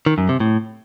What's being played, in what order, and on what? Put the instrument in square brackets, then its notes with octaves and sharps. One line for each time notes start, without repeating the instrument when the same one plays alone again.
[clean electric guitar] D#3
F#2
C3
A2